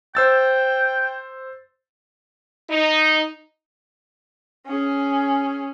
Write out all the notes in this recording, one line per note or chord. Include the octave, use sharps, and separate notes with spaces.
C5 G5 E6 A6
D#4
C#4 G#4